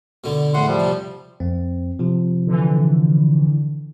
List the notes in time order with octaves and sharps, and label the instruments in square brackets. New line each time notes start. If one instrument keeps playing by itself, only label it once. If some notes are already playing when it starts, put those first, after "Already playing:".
[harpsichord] B2 D3
[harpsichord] E2 A2 [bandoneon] F#5 C6
[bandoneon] F3 G3
[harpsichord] C3
[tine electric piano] F2 C4
C3 F3
[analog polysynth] D3 E3